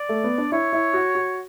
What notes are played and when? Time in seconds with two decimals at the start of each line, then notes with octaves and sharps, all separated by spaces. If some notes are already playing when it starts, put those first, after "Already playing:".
Already playing: D5
0.09 A3
0.24 B3
0.38 D4
0.52 E4 C#5
0.73 E4
0.94 F#4
1.15 F#4